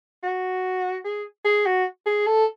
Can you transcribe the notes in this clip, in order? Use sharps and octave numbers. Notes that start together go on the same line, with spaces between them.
F#4
G#4
G#4
F#4
G#4
A4